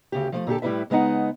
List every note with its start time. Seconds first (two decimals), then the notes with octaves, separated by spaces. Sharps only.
0.12 D2 C#3 G4
0.32 F3 G#3 A3
0.47 A#2 D3 F#4 G4 A4
0.62 A2 G3 E4 A4 B4 E5
0.90 C#3 G#3 B3 D#4 F#5